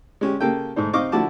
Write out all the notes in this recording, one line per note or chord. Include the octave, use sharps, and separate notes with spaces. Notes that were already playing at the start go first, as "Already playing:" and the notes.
G#3 C#4 G4
C#3 A#3 G4 A4 G5
G#2 A3 D#4 C5
C4 D#4 D#5 F5 C#6 D6
D3 F3 E4 F#4 A5 D6